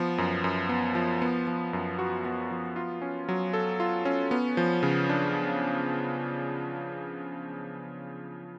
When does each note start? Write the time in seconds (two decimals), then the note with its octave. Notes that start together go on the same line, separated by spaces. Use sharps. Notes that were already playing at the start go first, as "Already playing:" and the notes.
Already playing: F3 B3
0.18 F#2
0.44 F#2
0.69 B3
0.95 F3
1.22 B3
1.47 F3
1.73 F#2
1.99 F#4
2.25 B3
2.51 F3
2.76 F4
3.02 C#4
3.29 F#3
3.53 A4
3.80 F4
4.05 C#4
4.31 B3
4.57 F3
4.83 C#3
5.09 D4